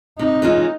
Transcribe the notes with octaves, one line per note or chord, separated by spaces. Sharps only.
C3 D#4
E3 G#3 C#4 F4